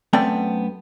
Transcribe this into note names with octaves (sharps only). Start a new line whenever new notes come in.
F#2 A3 B3 C4 D5 G5